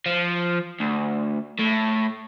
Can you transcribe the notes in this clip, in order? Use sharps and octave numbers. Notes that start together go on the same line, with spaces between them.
F3
D2
A2